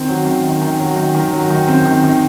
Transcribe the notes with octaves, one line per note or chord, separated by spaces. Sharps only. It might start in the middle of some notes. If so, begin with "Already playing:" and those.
Already playing: D#3 C4
F#3
D#3
D#3
D#3
F#3
D#3
D#3
F#3
D#3
C4
D#3
D#3